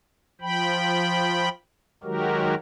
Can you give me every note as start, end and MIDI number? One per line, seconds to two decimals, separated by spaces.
0.41 1.49 53
0.41 1.49 79
0.41 1.49 83
2.04 2.55 51
2.04 2.55 54
2.04 2.55 56
2.04 2.55 66
2.04 2.55 67
2.04 2.55 70